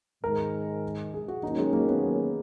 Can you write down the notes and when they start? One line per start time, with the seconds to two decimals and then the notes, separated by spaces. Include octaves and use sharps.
0.23 G#2 D#3 G#3 A#4
1.14 G#4
1.28 F#4
1.43 D#2 D#3 F#3 C#4 D#4
1.58 G#3
1.73 A#3
1.88 B3